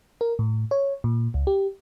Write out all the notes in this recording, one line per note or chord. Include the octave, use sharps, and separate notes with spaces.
A#4
A2
C#5
A#2
C#2
G4